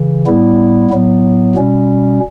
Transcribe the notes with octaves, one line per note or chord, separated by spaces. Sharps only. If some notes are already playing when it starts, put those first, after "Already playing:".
Already playing: C#3 E3
A2 G3 B3 E4
A2 F#3 B3
B2 G3 C#4